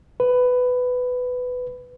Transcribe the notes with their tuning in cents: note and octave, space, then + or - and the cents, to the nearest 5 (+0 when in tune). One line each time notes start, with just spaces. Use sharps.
B4 +10